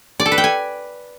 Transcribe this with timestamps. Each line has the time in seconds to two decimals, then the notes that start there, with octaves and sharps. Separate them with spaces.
0.20 D5
0.26 A4
0.32 B4
0.38 G5
0.44 G#5